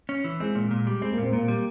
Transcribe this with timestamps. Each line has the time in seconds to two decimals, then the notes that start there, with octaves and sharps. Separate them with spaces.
0.09 C#4
0.24 E3
0.40 G#3 C4
0.55 A#2
0.71 A#2
0.87 G3
1.01 G#3 C4
1.12 A#3
1.18 A#2
1.23 C4
1.32 A#2 A#3
1.48 G3